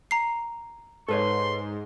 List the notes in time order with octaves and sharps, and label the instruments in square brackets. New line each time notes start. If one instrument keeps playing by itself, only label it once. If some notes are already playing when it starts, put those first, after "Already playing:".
[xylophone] A#5 C7
[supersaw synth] G#2 [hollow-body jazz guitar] A4 B4 C#5 [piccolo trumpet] C6